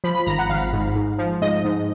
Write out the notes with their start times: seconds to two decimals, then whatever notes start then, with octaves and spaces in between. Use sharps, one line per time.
0.04 F3 B5
0.15 B5
0.26 G#1 A#5
0.39 F#5
0.49 G#1 F5
0.73 G#2
0.96 G#2
1.18 F3
1.42 G#2 D#5
1.65 G#2